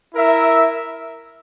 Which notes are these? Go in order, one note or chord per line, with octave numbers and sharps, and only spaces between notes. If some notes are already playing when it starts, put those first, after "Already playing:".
E4 A#4 E5